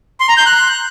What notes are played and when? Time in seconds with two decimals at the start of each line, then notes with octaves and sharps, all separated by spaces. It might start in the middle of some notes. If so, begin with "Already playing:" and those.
0.20 C6
0.29 A#5
0.37 G6
0.46 F#6